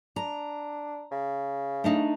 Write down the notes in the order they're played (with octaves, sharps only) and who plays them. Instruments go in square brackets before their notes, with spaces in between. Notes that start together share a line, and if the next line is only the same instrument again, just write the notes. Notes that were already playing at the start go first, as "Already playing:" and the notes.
[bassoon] D4 [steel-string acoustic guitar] A#5
[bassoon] C#3
[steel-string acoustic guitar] A3 D4 D#4